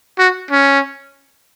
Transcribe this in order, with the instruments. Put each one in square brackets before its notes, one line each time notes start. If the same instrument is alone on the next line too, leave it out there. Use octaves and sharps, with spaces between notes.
[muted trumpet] F#4
C#4